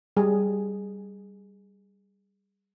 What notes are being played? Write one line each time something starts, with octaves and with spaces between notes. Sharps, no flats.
G3 G#4